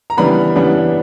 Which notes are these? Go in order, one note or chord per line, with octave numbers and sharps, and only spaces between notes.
A#5
C#3 E3 G3 B3 D4 B5
C#3 E3 G3 B3 D4